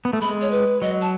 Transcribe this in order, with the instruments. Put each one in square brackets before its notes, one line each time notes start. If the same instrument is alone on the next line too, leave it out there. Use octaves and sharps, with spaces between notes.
[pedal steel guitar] B3
A3
[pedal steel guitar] G#3 [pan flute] B5
[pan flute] C#5
B4
[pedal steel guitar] F#3 [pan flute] D#5
[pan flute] A5